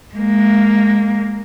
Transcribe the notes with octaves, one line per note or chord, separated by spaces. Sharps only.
G#3 A#3